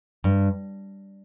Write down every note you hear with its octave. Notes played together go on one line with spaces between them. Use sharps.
G2